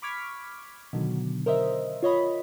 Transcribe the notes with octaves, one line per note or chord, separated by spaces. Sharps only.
B5 C#6 D6 F6 G#6 B6
B2 D3 D#3 F#3
A#4 C5 D#5 E5
F4 C#5 D#5 B5